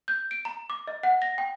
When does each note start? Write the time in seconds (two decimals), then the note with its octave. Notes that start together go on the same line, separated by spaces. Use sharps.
0.08 G6
0.31 D7
0.45 A#5
0.70 D6
0.88 D#5
1.03 F#5
1.22 A#6
1.38 G5